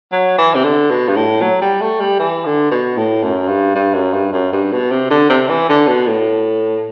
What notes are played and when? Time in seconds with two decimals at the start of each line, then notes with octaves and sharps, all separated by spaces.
0.12 F#3
0.38 E3
0.54 C3
0.64 D3
0.90 B2
1.08 G2
1.16 A2
1.41 F#3
1.61 G3
1.81 A3
2.00 G3
2.19 E3
2.45 D3
2.71 B2
2.97 A2
3.23 F#2
3.48 G2
3.75 G2
3.94 F#2
4.13 G2
4.33 F#2
4.53 G2
4.72 B2
4.91 C3
5.10 D3
5.29 C3
5.49 E3
5.69 D3
5.88 B2
6.07 A2